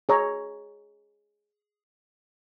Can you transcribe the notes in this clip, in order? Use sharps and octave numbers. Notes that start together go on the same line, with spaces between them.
G#4 C#5 A#5